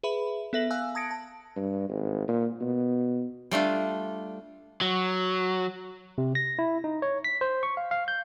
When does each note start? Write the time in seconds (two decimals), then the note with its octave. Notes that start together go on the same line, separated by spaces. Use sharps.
0.03 G#4 B4 E5 B5
0.53 B3 A4 E5 A#6 F#7
0.71 F5 G#5 E6 F#6
0.95 A5 D#6 G#6 A#6 C#7 D7
1.11 A5
1.56 G2
1.89 G#1
2.28 A#2
2.61 B2
3.51 G3 A3 D4 F4
4.81 F#3
6.18 C3
6.35 A#6
6.59 E4
6.84 D#4
7.02 C#5
7.24 B6
7.41 C5
7.63 C#6
7.77 F5
7.91 F5
8.08 G6